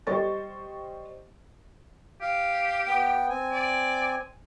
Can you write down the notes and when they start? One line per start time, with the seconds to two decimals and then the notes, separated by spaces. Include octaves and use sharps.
0.07 G3 C5 D#5 C#6 A6
2.21 G4 F5
2.87 B3 G5
3.29 C4 G#5
3.52 D5